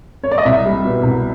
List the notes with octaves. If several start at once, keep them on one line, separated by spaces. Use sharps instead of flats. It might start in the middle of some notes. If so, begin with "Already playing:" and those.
C#5
D5
D#5
C2 E5
G3
B2
C2